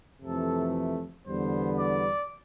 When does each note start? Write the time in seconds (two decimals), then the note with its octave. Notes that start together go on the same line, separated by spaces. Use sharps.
0.22 F2 C3 E3 A3 A4
1.26 E2 D3 G3 B3 C5
1.77 D5